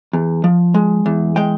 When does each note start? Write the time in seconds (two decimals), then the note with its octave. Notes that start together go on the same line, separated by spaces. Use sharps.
0.13 E2
0.44 F3
0.74 G#3
1.06 E2
1.36 G#3 G5